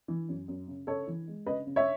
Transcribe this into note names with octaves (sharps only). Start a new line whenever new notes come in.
E3
F#2
F#2
C#3
C#3 A4 C#5
E3
G#3
C#3 B4 D#5
C#3
C#5 E5